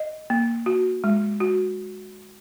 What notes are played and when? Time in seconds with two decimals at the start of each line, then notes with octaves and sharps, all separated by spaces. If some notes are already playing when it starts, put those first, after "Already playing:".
Already playing: D#5
0.30 A#3
0.66 F#4
1.04 G#3
1.40 F#4